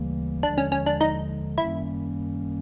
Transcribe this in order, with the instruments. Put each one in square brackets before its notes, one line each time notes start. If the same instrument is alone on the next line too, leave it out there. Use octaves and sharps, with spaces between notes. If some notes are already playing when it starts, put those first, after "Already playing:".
Already playing: [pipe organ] D2 C#3 E3 G3 A#3
[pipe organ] D#2 D3 F3 G#3 [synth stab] D4
[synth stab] C#4
C#4
D4
D#4
[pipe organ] F#2 D#3 G3 A#3 C#4 [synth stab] E4